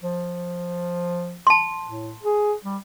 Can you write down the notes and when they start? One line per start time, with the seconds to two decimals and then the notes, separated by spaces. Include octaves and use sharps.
0.03 F3
1.47 A5 C6
1.87 A2
2.23 G#4
2.64 G3